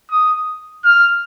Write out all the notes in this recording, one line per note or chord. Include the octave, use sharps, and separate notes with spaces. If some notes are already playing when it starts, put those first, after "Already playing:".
D#6
F6